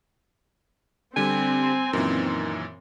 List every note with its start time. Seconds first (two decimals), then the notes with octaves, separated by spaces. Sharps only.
1.17 D3 G3 C4 G#5
1.93 F#2 A#2 D#3 E3